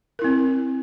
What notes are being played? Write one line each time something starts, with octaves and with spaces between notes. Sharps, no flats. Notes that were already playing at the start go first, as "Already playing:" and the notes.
C4 E4 A#4